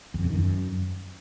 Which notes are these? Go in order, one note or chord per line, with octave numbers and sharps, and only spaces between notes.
E2
F2
C3
D#3
F#2